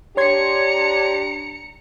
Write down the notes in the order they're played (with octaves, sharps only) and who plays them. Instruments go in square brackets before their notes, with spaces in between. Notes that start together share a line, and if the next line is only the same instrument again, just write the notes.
[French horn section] D4 G4 [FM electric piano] C#5 C6 G#6 [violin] A#5 C#7